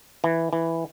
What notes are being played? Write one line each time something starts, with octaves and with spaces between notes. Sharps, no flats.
E3
E3